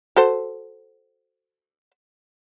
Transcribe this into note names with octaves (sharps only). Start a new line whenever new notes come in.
F#4 A4 C5